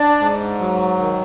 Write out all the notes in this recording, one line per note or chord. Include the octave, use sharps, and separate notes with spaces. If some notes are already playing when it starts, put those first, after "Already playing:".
Already playing: D4 D5
G#2
F#3
D#3